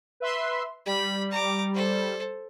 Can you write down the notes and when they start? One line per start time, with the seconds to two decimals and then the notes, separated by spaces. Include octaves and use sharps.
0.20 B4 E5 C6
0.86 G3 B5
1.32 A#5 D6
1.74 A4 C5